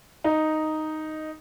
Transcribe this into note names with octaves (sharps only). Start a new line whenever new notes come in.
D#4